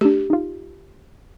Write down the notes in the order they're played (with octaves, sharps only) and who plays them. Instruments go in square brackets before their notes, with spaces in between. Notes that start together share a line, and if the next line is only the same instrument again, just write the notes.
[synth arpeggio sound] A3 D4 [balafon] G4
[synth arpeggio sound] D#4 F4